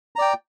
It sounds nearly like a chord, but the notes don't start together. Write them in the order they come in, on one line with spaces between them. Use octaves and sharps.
A#5 D5 G5